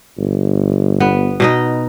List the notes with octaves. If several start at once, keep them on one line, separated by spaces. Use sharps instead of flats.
G1
B3
B2 D#4 D#5